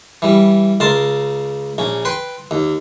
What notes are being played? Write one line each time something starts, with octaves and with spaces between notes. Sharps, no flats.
E3 G3
C#2 A#4 A5 C6
A#1 C#4
B4 G5 C6
D#2